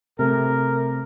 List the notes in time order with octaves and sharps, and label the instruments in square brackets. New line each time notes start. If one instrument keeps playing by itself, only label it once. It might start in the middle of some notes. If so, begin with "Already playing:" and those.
[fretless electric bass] C3 A3 [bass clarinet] A#4